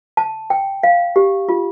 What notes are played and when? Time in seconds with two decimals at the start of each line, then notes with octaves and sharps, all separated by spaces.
0.17 A5
0.50 G5
0.83 F5
1.16 G4
1.49 F4